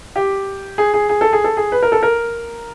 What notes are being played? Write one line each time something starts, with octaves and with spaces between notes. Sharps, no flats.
G4
G#4
G#4
G#4
A4
G#4
A4
G#4
B4
A#4
A4
A#4